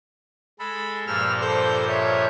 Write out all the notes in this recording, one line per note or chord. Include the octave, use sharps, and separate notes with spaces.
G#3 A4 B5
G2 A#2 F3 E6 F6
A4 C5 G6
C#5 E5